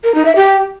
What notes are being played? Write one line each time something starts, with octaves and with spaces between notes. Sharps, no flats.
A#4
D#4
E5
G4